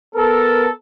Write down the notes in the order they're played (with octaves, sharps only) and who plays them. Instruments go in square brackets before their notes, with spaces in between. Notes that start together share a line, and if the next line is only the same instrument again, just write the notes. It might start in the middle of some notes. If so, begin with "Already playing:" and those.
[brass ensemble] B3 A4 A#4